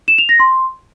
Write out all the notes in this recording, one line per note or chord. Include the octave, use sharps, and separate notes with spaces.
E7
F7
A#6
C6